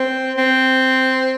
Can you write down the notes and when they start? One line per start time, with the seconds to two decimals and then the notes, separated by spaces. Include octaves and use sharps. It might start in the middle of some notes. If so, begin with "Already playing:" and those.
Already playing: C4
0.38 C4